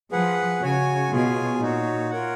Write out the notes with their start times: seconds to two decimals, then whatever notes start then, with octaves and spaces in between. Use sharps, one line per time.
0.11 F3 G#4 B4 F#5
0.61 C#3 F#4 C#5 G#5
1.11 B2 F4 G#4 C#5 G#5
1.61 A#2 D#4 F#4 C#5
2.10 F4 A#4 C#5 F#5